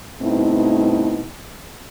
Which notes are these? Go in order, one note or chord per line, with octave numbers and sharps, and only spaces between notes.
G2 B2 A3 C4 D#4 E4